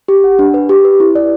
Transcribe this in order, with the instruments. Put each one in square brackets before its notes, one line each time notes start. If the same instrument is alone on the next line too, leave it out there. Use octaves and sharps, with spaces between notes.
[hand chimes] G4
F#5
D4
B4
G4
B4
E4
D5